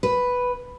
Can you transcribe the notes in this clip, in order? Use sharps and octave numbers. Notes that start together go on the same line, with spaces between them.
B4